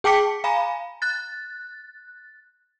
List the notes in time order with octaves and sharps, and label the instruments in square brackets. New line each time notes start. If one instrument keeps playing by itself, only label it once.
[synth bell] G#4 G5 A5 D6 B6 C#7
F5 G#5 A#5 B5
F#6 A6